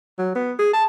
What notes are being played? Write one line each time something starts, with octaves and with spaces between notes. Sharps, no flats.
F#3
B3
G#4
A5